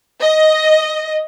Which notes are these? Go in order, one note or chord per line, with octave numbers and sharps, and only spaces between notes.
D#5